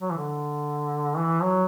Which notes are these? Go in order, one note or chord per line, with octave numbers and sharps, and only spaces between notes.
F#3
E3
D3
E3
F#3